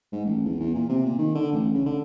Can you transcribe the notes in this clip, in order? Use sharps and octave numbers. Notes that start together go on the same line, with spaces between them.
G#2
A1
E2
E2
A#2
C3
A#2
D#3
D3
A1
C#3
D3